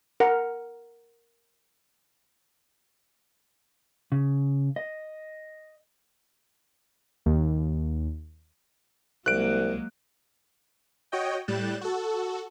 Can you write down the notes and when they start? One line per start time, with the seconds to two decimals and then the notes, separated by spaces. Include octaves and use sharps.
0.20 A#4 F#5
4.12 C#3
4.76 D#5
7.26 D#2
9.26 C2 F#3 G#3 A#3 F#6 D7
11.12 F#4 C#5 D#5 G5
11.48 A2 G3 F#6 G6 A6 E7
11.81 F#4 A4